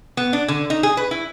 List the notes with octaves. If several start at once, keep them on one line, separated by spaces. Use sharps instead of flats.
B3
D4
D3
D#4
G#4
B4
E4